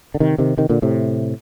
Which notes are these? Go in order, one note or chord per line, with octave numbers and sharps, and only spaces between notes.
D3
C3 D#3
C3 D#3
C3 D#3
A#2 D3
A2 C3